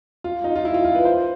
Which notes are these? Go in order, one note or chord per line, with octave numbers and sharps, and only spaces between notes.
F4
D#4
F4
E4
F4
F4
B4
C5